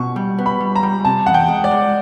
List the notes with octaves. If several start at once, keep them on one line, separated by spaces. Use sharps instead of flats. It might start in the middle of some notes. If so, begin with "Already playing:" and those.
Already playing: B2 C#6
G3
B3
B5
G3
A#5
G3
C3 A5
E2 F#5
G5
G#3
D5
G#3